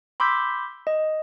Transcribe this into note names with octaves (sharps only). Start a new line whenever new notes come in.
B5 C6 D6 E6 G6 B6
D#5